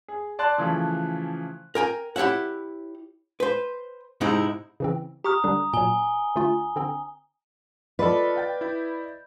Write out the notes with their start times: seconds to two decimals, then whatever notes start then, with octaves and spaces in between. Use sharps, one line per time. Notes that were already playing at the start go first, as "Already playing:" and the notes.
0.08 G#4
0.39 D5 A5 C6 F#6
0.58 C#3 E3 F3 A3
1.75 A#4 G5 G#5
2.16 E4 G4 C#5 E5 F#5
3.40 B4 C5
4.21 G#2 C3 G#3 C4 D#4 E4
4.80 C#3 E3 C4
5.24 G4 A#5 C#6 D#6 F6
5.44 D3 G3 D4
5.73 A#2 F#3 G#5 G7
6.36 D3 A3 F4
6.76 D3 C4
7.99 F4 A4 B4 D5 D#5 B5
8.36 F5 G5 A6
8.61 E4 G6